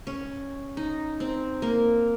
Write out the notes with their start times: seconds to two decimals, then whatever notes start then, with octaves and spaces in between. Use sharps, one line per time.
0.07 C#4
0.77 D#4
1.20 C4
1.62 A#3